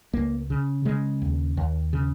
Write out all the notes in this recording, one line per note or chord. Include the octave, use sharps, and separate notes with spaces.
C#2 A#3
C#3
C#3 G#3
D#2
D#2
C#3